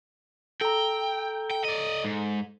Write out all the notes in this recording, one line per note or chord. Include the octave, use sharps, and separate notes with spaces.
A4 G5 A#5
G5
D5 D#5
G#2